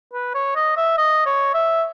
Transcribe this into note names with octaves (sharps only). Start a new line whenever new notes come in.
B4
C#5
D#5
E5
D#5
C#5
E5